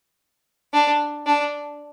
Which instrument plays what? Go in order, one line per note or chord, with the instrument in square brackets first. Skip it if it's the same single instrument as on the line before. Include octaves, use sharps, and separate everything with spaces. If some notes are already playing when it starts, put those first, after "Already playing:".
[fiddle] D4
D4